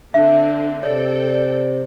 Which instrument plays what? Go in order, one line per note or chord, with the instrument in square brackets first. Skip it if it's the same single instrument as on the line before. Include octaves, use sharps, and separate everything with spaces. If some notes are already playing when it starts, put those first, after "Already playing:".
[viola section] D3 C4 [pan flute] D4 [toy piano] E5
[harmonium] C3 [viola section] A4 G5 [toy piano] C#5 [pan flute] D5